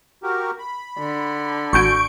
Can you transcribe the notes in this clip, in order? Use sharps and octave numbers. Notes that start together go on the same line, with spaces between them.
F#4 G4 A#4
B5
D3
A1 F#4 G#5 C#6 G6 D7